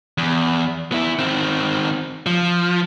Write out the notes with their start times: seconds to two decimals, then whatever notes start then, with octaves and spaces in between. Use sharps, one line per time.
0.18 E2
0.92 B3 E4
1.19 D#3 C4
2.26 F3